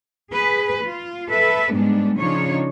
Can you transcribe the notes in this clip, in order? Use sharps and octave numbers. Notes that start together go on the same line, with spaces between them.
G#4 B4
F4
A4 B4 E5
G#2 G3 G#3 B3 D4
C#3 F3 D4 D#4 F4 C#5